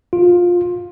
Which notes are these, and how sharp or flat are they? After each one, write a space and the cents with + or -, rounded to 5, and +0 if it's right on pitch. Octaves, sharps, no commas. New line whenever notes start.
F4 +15